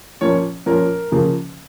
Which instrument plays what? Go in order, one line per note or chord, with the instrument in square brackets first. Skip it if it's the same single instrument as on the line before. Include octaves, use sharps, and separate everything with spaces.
[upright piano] A#2 F3 C#4 [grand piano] C#5
[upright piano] A#2 F3 C#4 [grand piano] A#4
[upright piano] C#3 F3 A#3